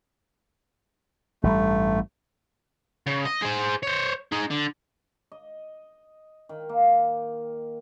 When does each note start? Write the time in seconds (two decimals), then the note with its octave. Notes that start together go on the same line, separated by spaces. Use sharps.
1.43 A1 G2 G3 A3
3.07 C#3
3.25 D#5
3.42 G#4 C5
3.83 C5 C#5
4.32 D#4 G#4
4.51 D3
5.32 D#5
6.49 D#3
6.69 A#3